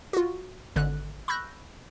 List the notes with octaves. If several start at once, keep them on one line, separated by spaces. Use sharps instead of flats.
F4 F#4
G#1 D3 F#6
B5 C#6 E6 F#6 G6 A#6